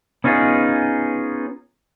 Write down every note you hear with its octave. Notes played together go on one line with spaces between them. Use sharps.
B3 C#4 D#4 F4 G#4